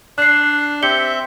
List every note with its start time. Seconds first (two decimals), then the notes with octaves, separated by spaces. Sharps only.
0.18 D4 F#6 C7
0.83 C4 G4 E5 G6 C#7 G7